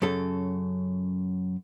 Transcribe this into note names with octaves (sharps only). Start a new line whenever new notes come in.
F#2 C#3 A4